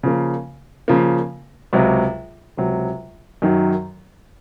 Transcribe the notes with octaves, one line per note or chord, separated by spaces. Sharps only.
C#3 F3 A#3
C#3 F3 A#3
C#2 C3 F#3
C#2 C3 F#3
F#2 D#3 F#3